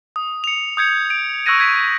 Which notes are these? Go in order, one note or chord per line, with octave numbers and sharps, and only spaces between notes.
D#6
C#7 F7
D#6 G6 G#6 C#7
D7
C#6 E6 F#6 G#6 A#6 D#7
G#6 B6